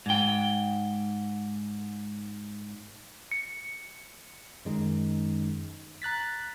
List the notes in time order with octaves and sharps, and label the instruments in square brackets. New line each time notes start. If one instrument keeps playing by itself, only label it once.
[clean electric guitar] G#2 G5
[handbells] C#7
[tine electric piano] F#2 D#3 G#3 C#4 D#4
A#5 F#6 A6 B6